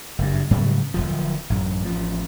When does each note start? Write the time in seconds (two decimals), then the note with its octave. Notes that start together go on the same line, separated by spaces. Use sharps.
0.19 F#1 G2
0.51 G#2 C#3 F#3 G3
0.94 D1 G#1 F3
1.50 A1 F#2
1.85 A1 F3